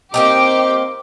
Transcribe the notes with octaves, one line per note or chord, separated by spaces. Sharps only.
A#3 C4 D#4 G4 D6